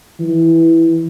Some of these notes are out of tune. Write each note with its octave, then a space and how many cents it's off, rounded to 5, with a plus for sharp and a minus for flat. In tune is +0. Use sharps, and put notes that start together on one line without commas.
E3 -5